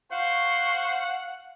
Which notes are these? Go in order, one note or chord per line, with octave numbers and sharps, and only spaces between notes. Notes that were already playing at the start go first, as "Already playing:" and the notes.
C5 F5 F#5 C#6